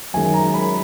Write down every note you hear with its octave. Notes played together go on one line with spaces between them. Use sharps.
F#2 D#3 G#3 G#5
A#5
B5